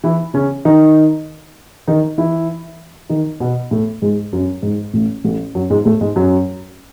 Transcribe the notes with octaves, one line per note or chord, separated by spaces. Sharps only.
E3 E4
C#3 C#4
D#3 D#4
D#3 D#4
E3 E4
D#3 D#4
B2 B3
A2 A3
G#2 G#3
F#2 F#3
G#2
A1 A2
A1 A2
F#2 F#3
G#2 G#3
A2 A3
G#2 G#3
F#2 F#3